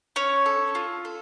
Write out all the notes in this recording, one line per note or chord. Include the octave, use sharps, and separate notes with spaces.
C#4 C#5
A4
F4
A4